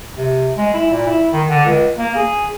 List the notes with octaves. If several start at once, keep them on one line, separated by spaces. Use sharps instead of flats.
C3
G#3
E4
A#2
E4
D#3
D3
C#2
A#3
G#4